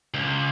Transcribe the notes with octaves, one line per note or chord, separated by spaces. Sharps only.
C#2